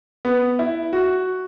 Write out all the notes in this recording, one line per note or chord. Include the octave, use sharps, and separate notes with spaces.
B3
E4
F#4